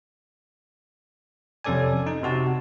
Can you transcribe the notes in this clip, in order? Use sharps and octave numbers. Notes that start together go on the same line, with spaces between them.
F2 C3 C#4 A4 D5 G#5
D#4
C3 F#4 A5